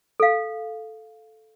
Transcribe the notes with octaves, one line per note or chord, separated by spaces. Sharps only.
A4 F5